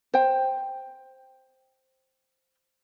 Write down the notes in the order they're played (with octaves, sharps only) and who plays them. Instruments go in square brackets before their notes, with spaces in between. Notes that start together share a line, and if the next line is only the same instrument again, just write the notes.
[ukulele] C5 G5